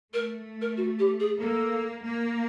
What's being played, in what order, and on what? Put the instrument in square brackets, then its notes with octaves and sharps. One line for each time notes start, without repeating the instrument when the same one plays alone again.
[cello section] A3 [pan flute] A#4
[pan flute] A#4
F#4
G4
G#4
[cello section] A#3 [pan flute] A4
[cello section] A#3